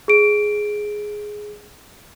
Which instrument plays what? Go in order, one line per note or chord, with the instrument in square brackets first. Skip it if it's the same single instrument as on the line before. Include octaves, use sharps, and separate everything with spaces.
[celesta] G#4 D7